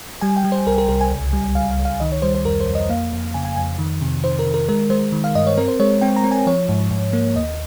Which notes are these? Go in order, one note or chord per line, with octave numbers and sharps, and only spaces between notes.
G3 G#5
G5
G3
C5
C2 A#4
A#4
C2 A#4
G#5
C#2
G3
C#2 F5
F5
C#2
F5
D#3 D#5
C#5
G3 C5
C5
F2 A#4
C5
F2
D#5
A#3 F5
F2
C#3 G#5
G#5
F2 G#5
D#3
C3
D#3 C5
A#4
D#3
A#4
G#3 A#4
G#3 C5
D#3
F5
G2 D#5
C#5
C4 A#4
C5
G#3 C#5
C4 G5
A#5
C4
G#5
F3 C#5
G#2
G#2
A#3
D#2 D#5